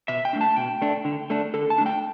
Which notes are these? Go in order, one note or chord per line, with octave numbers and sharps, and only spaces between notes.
B2 E5
G5
A3 D4
A5
B2 G5
A3 D4
D3
A3 D4
D3 A4
A5
A3 D4
G5